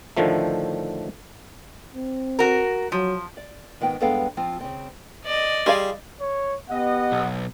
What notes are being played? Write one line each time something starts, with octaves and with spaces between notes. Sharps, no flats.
A2 D3 D#3 F3 A3
C4
F#4 A#4
F3 F#3
D5
G#2 D#3 B3 G5
G2 G#3 B3 A4 F5 G5
F3 C4 F4
C#3 C4
D5 D#5
G3 F4 G#4 F5
C#5
B3 G4 D#5 F#5
B1